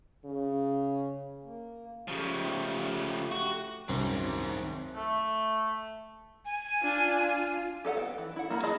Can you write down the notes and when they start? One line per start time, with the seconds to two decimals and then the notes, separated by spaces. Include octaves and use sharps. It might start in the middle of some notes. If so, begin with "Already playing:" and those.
0.25 C#3
1.42 A#3
2.08 C#3 F3 A3 G4
3.32 F#4
3.89 C2 F#2 D#3 C4
4.95 A3
6.45 G#5
6.81 D4 F4
7.21 F4
7.85 G4 A4 F5 F#5
7.97 B3 G5
8.18 E3
8.36 E4 F#5
8.50 A#3 E4 B5
8.63 F4 G#4 D#5 A5 B5